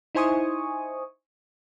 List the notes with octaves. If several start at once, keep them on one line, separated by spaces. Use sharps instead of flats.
D#4 E4 C5 G#5 C#6 D#6